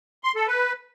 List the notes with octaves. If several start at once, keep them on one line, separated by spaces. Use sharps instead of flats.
C6
A4
B4